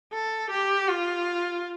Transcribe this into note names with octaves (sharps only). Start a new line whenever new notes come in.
A4
G4
F4